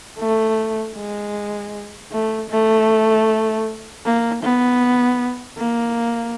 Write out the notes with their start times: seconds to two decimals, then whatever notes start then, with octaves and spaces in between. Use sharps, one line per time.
0.19 A3
0.97 G#3
2.11 A3
2.50 A3
4.05 A#3
4.43 B3
5.58 A#3